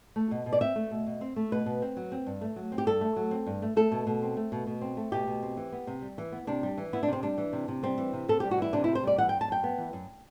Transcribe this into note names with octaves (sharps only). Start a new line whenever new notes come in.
A3
B2
B2
D5
C4 E5
A3
B2
B2
C4
A3
B2 B4
B2
C4
F#3
C4
G2
A3
F#3
C4
G4
G2 A4
A3
F#3
C4
G2
A3
A3 A4
B2
B2
C4
A3
B2
B2
C4
A3
B2 G4
B2
C4
E3
B3
C3
G3
E3
B3
C3 D4
G3
E3
B3 E4
D4
C3 C4
G3 D4
E3
C3
C3
G3 C4
E3
C3
C3 A4
G3 G4
F#4
E3 E4
C3 D4
E4
C3
C5
G3 D5
E3 F#5
G5
F#2
A5
F#2 G5
B3
E3
F#2